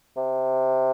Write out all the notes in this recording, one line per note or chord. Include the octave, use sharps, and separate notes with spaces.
C3